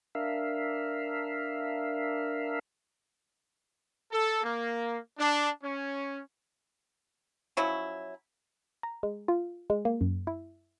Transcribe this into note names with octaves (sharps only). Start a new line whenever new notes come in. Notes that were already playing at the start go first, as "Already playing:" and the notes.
D4 A#4 E5 F5
A4
A#3
D4
C#4
F3 F#3 C#4 E4
A#5
G#3
F4
G#3
A#3
F#2
E4